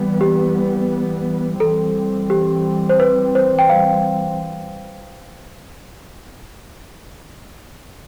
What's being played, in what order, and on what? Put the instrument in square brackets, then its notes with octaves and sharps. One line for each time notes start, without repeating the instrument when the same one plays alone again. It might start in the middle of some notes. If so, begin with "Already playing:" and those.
Already playing: [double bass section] E3 G3 B3
[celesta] G4
[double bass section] E3 G3 C4 [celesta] A4
[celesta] G4
C5
B4
C5
G5
F5